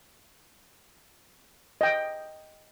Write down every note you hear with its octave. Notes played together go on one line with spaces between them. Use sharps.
D#5 G5